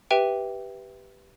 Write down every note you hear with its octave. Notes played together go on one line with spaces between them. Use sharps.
G4 B4 E5 G5 D#7